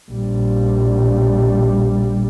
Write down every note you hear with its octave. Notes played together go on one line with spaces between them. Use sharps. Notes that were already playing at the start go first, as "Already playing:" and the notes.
A#1 G3